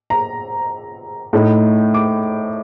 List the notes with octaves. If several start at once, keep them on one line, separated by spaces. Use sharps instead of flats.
A#5
A2 A3 D#4
D6